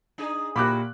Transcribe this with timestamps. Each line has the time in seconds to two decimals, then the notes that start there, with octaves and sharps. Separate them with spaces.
0.18 D4 D#4 G#4
0.56 A#2 E4 F#4 G4 B5 D6 F#6